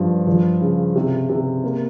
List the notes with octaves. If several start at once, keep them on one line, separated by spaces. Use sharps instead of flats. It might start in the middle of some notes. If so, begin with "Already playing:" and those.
Already playing: G2 F3
F3
C#3
C3
C3
A#3